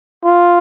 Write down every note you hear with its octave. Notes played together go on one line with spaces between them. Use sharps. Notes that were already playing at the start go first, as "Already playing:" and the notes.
F4